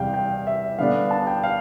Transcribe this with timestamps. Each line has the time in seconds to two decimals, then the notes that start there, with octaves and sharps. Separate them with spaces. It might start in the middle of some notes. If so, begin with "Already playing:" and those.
Already playing: E2 C3 G3 F5 G5
0.14 G5
0.47 E5
0.79 D3 G3 B3 D4 F5
1.11 A5
1.27 G5
1.43 F5